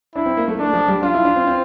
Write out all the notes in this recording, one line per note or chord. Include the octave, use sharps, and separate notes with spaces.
D4 E4
C4
A#3
A3
A3 D4
F3
G3
D4 F4
E4
D4
C4
C4